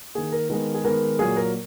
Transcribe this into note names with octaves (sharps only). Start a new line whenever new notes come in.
D#3 A#3 G#4
A#4
D#3 G#3 B3 A#4
G#4
D#3 G#3 B3 A#4
A#2 F#3 A#3 G#4
A#4